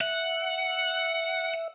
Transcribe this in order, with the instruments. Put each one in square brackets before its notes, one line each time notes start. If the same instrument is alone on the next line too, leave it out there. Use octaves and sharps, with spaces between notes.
[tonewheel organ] E5 [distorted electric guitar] F#5